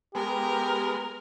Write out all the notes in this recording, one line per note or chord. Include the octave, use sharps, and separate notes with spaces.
G#3 B3 G4 A#4